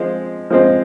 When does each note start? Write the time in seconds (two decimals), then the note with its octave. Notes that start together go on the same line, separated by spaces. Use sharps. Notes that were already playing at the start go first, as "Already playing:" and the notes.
Already playing: F3 G#3 C4
0.50 F3 G#3 C4